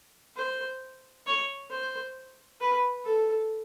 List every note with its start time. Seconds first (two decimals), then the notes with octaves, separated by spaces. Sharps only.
0.36 C5
1.27 C#5
1.71 C5
2.61 B4
3.05 A4